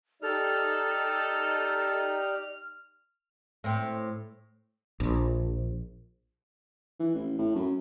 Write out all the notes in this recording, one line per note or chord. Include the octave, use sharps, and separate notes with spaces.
D#4 G4 A4 D5 F6
A2 C4
A#1
E3
A1
A2
F#2